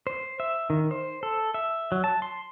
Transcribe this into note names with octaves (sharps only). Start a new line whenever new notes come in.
C5
E5
D#3
C5
A4
E5
F#3
A5
C6